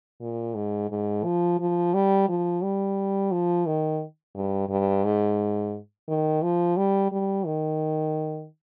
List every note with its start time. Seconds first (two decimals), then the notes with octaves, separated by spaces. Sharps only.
0.21 A#2
0.55 G#2
0.91 G#2
1.25 F3
1.60 F3
1.94 G3
2.29 F3
2.63 G3
3.32 F3
3.67 D#3
4.35 G2
4.70 G2
5.05 G#2
6.08 D#3
6.43 F3
6.77 G3
7.12 G3
7.47 D#3